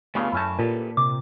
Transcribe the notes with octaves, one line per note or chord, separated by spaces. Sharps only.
G2 C#3 A3 B3 F4
F#2 A3 C#4 E4 A5
A#2 G4 A4 B4
C3 D6